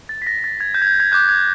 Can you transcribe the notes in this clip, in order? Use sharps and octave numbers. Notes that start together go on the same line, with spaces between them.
A6
B6
A#6
A#6
A6
G#6
G6
G#6
G6
G#6
D6 F#6 G6
G#6